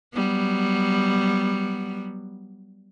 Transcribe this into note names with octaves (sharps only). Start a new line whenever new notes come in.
F#3 G3 B3